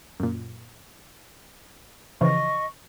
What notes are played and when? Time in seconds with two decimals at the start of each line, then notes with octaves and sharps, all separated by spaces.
0.20 F#2 A#2
2.21 C#3 E3 F3 D#5 C#6